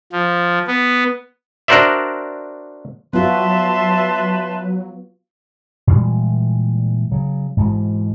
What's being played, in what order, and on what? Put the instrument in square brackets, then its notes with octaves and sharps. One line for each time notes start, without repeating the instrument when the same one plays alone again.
[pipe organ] F3
B3
[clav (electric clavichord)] D4 F#4 A#4 C5 D5 E5
[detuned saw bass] F#3 [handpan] B3 F4 F#4 [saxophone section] B4 [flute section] E5 A5 C6
[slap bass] A#2 E3 G3 G#3
C#3 F#3
G#2 B2 E3